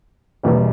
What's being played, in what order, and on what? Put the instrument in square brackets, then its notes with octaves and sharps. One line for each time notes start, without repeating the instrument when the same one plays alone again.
[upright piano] E1 E2 B2 G3 A#3